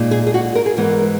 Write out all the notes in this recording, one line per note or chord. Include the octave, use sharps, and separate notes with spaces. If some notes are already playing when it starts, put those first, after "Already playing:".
Already playing: A#2 G#3 D#4
G#4
G#4
F#4
A#4
G#4
G#2 E3 G#3 B3 A#4